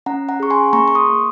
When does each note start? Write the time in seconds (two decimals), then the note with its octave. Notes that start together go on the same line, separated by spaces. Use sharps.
0.06 C#4 F#5 A#5
0.29 F#5 A#5
0.40 G#4 C#6
0.50 G#5 C6
0.73 A#3 A#5 C#6
0.88 C#6
0.95 C6 D#6
1.07 A#3